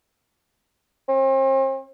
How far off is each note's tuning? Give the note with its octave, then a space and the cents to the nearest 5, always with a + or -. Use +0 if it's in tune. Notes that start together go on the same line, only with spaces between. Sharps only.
C4 +40